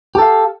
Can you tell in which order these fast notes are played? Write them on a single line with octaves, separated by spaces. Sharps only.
G4 A4 F5